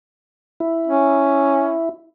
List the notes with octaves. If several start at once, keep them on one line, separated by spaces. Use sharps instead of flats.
E4
C#4